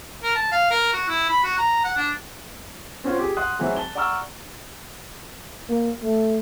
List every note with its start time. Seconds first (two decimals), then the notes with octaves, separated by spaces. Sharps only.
0.23 A#4
0.35 A5
0.52 F5
0.71 A#4
0.93 F#4
1.08 E4
1.29 B5
1.44 F#4
1.58 A#5
1.84 F#5
1.97 D4
3.04 C4 C#4 F4 F#4 C5
3.19 G4 G#4
3.37 F#5 C6 D#6 F#6
3.59 E3 F#3 C4 F#4 G#4
3.77 A5 G7
3.95 D5 F#5 A#5 C#6 E6 F6
5.69 A#3
6.03 A3